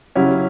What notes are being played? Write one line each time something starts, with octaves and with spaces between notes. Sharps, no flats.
C#3 F#3 C#4 E4 G4